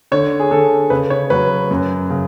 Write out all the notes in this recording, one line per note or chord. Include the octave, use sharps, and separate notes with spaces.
D3 C#5
G#4
D3 A4
C#3 B4
C#5
F#3 B4
F#2
C#3